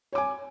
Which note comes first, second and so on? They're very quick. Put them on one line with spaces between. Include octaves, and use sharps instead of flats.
C#5 D6 G#5